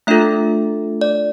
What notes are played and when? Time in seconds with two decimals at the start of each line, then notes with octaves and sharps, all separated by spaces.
0.07 A3 D4 F4 A4 E5
1.01 D5